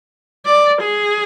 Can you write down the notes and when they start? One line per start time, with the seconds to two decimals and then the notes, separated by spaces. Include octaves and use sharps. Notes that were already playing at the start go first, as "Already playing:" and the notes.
0.45 D5
0.82 G#4